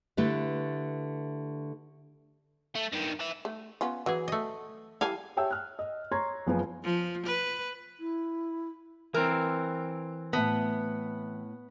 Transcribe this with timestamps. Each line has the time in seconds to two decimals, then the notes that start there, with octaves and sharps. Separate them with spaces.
0.17 D3 A3 E4 G4 B4
2.75 A3
2.92 G2 D#3
3.20 B4 E5
3.45 A3
3.81 B3 C#4 F4
4.06 E3 F#3 G#4
4.28 A3 D#5
5.01 E3 G3 A4 F5 G#5
5.37 G4 C#5 E5 G5 A5 E6
5.51 F6 F#6
5.79 D#5
6.12 C#5 A#5 C6 C#6 G#6
6.47 F#1 F3 B3 B4 G#5
6.84 F3
7.26 B4
8.00 E4
9.14 E3 C4 A#4
10.33 A2 B3 E5 A5